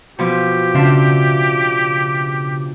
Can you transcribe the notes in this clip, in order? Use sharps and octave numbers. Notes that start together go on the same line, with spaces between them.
B2 F3 G4
C#3 D4 F4 E5